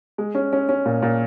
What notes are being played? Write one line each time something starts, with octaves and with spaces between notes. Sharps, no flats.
G#3
C#4
C#4
C#4
A#2
A#2